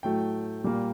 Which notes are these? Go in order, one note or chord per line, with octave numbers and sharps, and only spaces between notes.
A2 F#3 A3 G5
A#2 G3 A#3